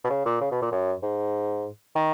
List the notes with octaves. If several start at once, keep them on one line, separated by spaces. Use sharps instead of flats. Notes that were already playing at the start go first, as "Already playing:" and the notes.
B2
C#3
A#2
C#3
B2
A#2
F#2
G#2
D#3